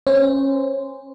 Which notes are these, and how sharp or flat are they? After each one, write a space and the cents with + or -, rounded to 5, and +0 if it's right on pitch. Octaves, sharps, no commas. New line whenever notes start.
C#4 -25 C5 -15